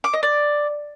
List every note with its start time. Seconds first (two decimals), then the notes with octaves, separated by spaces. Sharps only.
0.04 D6
0.13 D#5
0.23 D5